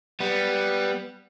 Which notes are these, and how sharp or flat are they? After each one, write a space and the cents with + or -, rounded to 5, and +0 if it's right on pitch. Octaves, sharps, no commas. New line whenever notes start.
G3 +0 B3 +0